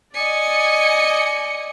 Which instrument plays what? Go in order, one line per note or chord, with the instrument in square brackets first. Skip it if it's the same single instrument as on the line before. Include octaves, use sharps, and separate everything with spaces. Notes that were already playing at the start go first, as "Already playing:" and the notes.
[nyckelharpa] D5 D#5 [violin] G#5 C#7